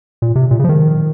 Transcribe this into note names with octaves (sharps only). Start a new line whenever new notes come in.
A#2
C3
A#2
C#3
F3
D#3